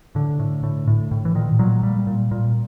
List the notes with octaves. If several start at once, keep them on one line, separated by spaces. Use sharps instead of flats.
A2 D3
A2
A2
A2
A2
E3
A#2 D#3
A#2 F#3
A#2 G3
A#2
A#2